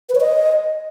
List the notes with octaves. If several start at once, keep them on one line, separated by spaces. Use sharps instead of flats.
B4
C#5
D#5